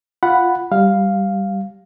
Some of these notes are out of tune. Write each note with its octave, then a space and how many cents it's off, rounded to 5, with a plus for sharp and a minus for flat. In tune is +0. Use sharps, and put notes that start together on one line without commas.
F4 +0 F#5 +0 B5 +0
G3 +0 F5 +0